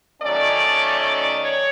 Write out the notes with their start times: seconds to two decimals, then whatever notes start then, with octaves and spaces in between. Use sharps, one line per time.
0.21 D#3 F#3 A3 C#4 D5
1.01 D5
1.40 C#5